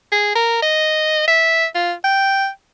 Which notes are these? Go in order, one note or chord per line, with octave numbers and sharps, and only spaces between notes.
G#4
A#4
D#5
E5
F4
G5